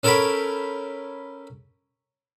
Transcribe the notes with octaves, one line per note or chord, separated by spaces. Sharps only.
C#4 A4 A#4 C#5 G5 B5